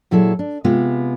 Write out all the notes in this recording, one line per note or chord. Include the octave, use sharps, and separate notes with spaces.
A#2 F#3 E4 G#4 A4
D4
C3 G#3 B3 F4